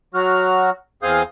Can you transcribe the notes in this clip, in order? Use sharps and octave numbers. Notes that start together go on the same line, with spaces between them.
F#3 F#4 F6
E2 C4 G#4 F5 D#6 G6